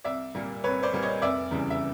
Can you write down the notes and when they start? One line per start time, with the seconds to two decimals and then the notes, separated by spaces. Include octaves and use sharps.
0.04 C2 D5 E5
0.35 A#2 G3 A#3
0.64 C2 B4 C#5
0.83 C5 D5
0.93 A#2 G3 A#3
1.03 C#5 D#5
1.22 F1 D5 E5
1.51 E2 C#3 E3 G3
1.70 E5